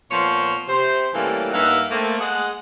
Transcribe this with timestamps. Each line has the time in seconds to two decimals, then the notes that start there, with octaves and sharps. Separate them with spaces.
0.11 A#2 F3 B3 C#5 C6
0.68 C3 C5
1.14 E3 G3 A3 A#3 C#4 A4
1.52 G2 A#3 D#4 E5 F#5
1.91 A3 A#3 C4
2.19 G#3 G#4 F#5